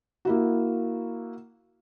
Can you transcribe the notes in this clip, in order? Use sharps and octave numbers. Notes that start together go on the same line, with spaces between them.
A#3 E4 F#4